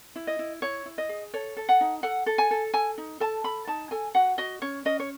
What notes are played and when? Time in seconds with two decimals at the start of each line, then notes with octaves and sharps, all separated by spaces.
0.16 E4
0.27 D#5
0.39 E4
0.62 E4 C#5
0.86 E4
0.98 D#5
1.09 G#4
1.34 A4 C#5
1.57 A4
1.69 F#5
1.81 D#4
2.03 A4 F#5
2.26 A4
2.38 G#5
2.51 A4
2.74 A4 G#5
2.98 D#4
3.20 A4 A5
3.44 A4 B5
3.67 D#4 A5
3.91 A4 G#5
4.15 F#4 F#5
4.38 F#4 D#5
4.62 C#4 C#5
4.85 C#4 D#5
5.00 C#5